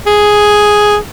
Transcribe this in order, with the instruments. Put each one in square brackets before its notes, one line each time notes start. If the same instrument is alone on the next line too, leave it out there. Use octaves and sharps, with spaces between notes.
[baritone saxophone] G#4